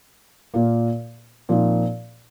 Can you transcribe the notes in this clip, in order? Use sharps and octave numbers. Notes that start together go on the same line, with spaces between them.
A#2 A#3 F4
A#2 F3 C4 D#4